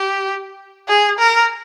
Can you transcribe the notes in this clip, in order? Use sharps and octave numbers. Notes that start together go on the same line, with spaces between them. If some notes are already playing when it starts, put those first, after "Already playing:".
Already playing: G4
G#4
A#4